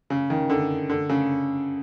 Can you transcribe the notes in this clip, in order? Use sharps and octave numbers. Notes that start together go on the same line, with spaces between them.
C#3
D#3
D3
D3
C#3